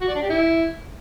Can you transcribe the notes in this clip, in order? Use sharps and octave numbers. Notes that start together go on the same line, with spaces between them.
F#4
D5
D4
G4
E4